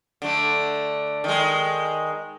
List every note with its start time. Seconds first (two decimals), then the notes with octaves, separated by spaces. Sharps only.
0.22 D3 A3
1.24 D#3 G#3